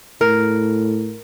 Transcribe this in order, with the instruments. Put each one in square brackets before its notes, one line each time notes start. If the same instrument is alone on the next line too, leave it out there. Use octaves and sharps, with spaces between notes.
[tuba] A2 [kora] A#4